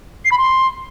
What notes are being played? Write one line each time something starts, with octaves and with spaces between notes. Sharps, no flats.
C7
B5
C6